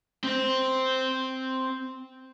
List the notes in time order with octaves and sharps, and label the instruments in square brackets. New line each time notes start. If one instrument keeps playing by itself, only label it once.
[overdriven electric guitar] C4 C5